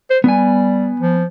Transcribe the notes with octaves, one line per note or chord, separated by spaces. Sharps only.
C5
G3 B3 G#5
F3